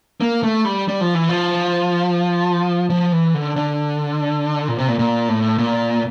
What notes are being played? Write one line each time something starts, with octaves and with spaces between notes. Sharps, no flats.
A#3
A3
G3
G3
F3
E3
F3
F3
E3
D3
D3
A#2
C3
A#2
A#2
A2
A#2